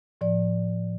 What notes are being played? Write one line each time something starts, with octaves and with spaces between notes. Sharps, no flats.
A2 F3 D5